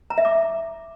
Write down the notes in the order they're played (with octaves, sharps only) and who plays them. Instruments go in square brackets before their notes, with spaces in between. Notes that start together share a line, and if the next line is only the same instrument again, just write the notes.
[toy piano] A#5
E5
D6